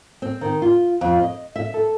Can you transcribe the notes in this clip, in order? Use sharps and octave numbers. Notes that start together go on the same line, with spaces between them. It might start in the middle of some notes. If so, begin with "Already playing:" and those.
C4
D#3
F4
F2
D#5
E5
A4